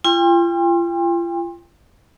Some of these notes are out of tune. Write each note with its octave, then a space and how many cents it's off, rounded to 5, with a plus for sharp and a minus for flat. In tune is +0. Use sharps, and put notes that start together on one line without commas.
F4 -35 G5 +35 C6 +25